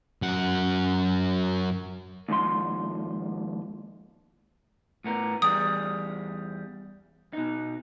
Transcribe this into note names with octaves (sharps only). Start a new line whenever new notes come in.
F#2 F#5
D#2 G#2 F3 C6
A2 B3 A#4
E2 G3 G#4 D#6
B2 D#4